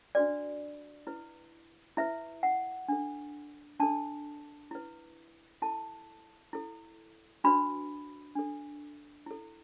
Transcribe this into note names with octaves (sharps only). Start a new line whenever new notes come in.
D4 F#4 B4 D5
E4 B4
E4 B4 E5
F#5
D4 A4
D4 A4 A5
E4 B4
E4 A4 A5
E4 A4
D4 F#4 B4 B5
D4 A4
E4 A4